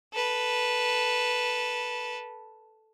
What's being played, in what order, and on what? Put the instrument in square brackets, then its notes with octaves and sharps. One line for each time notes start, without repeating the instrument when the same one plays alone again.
[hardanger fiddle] A4 B4